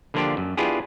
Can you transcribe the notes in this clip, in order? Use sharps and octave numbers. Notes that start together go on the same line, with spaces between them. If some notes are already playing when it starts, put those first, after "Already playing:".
D3 F3 A#3 D4 F4 G4
F#2
B3 D4 E4 F4 G4 G#4